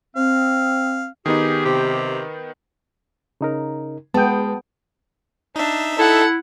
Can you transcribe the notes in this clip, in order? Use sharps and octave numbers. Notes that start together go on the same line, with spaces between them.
C4 F5
D#3 B3 D#4 G4 G#4
C3
C#3 D#4 A#4
G#3 B3 G5 A5 D#6
D4 D#4 E5
E4 A4 F#5